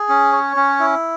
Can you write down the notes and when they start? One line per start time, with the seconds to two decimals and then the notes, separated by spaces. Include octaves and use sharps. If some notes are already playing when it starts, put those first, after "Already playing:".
Already playing: G#4
0.09 C#4
0.32 C#5
0.56 C#4
0.80 E4